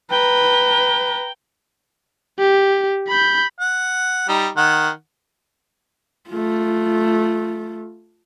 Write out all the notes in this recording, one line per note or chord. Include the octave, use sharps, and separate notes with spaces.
B4 G5 A#5
G4
B5 G6
F#5
G3 D#4
D#3 F#5
A3 F4